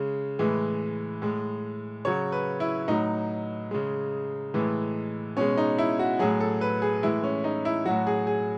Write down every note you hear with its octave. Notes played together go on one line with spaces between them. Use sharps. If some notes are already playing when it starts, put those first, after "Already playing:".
Already playing: C#3 G#3
A2 E3 G#3
A2 G#3
C#3 F#3 C#5
B4
E4
A2 F#3 D#4
C#3 G#3
A2 E3 G#3
B2 G#3 C#4
D#4
E4
F#4
A2 F#3 G#4
A4
B4
G#4
A2 E3 G#3 E4
C#4
D#4
E4
A2 F#3 F#4
G#4
G#4